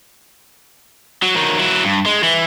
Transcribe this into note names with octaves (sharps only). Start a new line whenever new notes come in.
F#3
D#3 F#3
F#3 E4
G2
G#3
E3